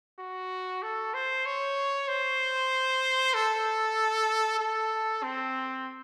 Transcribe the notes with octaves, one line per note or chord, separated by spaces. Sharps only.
F#4
A4
C5
C#5
C5
A4
A4
C4